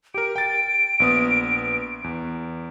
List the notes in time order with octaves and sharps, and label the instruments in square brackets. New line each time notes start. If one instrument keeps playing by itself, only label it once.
[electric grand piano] G4 A#4 [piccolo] D7
[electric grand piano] G5 A6
A#1 B3 D#6
E2